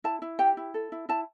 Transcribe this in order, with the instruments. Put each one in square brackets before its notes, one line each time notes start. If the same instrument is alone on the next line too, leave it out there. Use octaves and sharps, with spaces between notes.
[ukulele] E4 A5
E4
G4 G5
E4
A4
E4
E4 A5